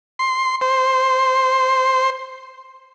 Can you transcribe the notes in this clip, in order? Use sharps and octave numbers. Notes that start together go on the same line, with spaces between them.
C6
C5